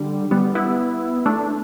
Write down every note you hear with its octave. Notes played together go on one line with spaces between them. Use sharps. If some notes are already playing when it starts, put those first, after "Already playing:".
Already playing: D3 G3
G3 B3
B3 E4
A3 D4